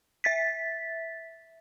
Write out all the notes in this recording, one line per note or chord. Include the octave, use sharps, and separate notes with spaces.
E5 A6 B6